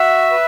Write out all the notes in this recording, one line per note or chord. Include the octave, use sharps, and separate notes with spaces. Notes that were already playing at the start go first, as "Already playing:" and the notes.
Already playing: F#4 E5
B4